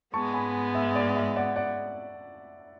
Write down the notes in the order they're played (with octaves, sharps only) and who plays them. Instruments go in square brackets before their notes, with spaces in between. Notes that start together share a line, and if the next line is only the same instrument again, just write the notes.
[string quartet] G#2 G#3 B3 [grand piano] A5 C#6
[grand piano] G#5 B5
E5
D5
E5
D5 F#5
D5 F#5